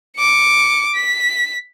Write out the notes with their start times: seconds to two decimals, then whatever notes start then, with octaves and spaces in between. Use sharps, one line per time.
0.17 D6 C#7
0.95 B6